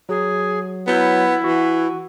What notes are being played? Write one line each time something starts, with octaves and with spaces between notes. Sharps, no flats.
F#3 G#4
F#3 B3 E4 G6
E3 F#4